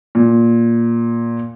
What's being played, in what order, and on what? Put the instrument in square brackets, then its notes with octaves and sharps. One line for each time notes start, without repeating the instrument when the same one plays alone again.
[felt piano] A#2